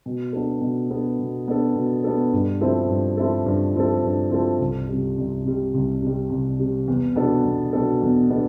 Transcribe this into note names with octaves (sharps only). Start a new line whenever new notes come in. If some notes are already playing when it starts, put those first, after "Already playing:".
B2
B3 D4 A4
B2
B3 D4 A4
B2
B3 D4 A4
B2
B3 D4 A4
G2
F3 C4 E4 A4
G2
F3 C4 E4 A4
G2
F3 C4 E4 A4
G2
F3 C4 E4 A4
C2
C3 G3
C2
C3 G3
C2
C3 G3
C2
C3 G3
E2
B2 B3 D4 A4
E2
B2 B3 D4 A4
E2
B2 B3 D4 A4